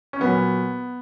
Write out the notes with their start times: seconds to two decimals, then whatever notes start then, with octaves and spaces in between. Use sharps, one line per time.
0.13 C#4
0.21 A#2 F#3 B3